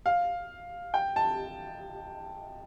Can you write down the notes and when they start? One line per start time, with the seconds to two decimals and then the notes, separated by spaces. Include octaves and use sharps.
0.06 F5
0.94 G5
1.16 A5